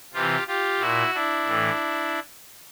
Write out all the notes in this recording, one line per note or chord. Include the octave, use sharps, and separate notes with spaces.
C3 E3 F4 G4
F4 G4
A#2 E4 F#4
D4 E4
A2 E3